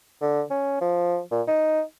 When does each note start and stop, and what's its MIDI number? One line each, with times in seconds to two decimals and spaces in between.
0.21 0.43 50
0.50 0.78 61
0.81 1.19 53
1.31 1.42 46
1.47 1.82 63